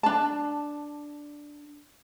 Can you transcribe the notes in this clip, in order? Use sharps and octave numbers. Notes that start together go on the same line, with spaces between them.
D4 A5